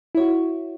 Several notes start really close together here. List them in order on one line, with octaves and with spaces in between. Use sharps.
E4 C#5 F#4